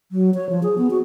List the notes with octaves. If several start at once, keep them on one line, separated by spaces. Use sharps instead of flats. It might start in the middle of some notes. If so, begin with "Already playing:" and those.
F#3
C#5
F3
G#4
B3
F#4